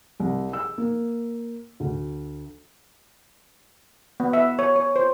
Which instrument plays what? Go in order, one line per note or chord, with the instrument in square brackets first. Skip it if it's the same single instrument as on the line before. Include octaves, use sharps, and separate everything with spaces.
[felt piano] C2
E6
A#3
D2
[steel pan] B3
E5
C#5
C#5
C5